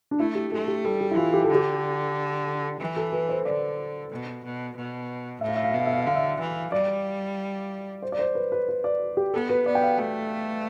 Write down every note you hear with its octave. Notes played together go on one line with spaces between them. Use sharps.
D4
A3 E4
G4
A3 A4
G4
G3 A4
G4
E4
E3 F4
G4
A4
D3 G4
E3
A4
B4
C5
D3 D5
B2
B2
B2
A2 E5
F5
E5
F5
E5
B2
F5
E5
F5
E5
D3 F5
E5
E3
G3 D5
C5
D5
C5
B4
B4
B4
D5
G4
B3 A4
B4
B3 D5
G5
F5
A3 G5